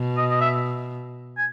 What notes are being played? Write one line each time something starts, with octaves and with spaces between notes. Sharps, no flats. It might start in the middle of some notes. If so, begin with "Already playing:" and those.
Already playing: B2
D#5
D#5
E5
G#5